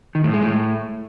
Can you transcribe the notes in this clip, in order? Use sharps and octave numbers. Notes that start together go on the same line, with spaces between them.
D#3
A2
G#3
A2